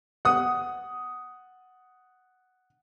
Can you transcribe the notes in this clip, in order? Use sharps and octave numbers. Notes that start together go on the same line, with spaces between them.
F#5 D#6